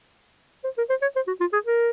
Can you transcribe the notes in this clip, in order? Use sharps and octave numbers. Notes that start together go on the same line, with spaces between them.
C5
A#4
C5
C#5
C5
F#4
F4
G#4
A#4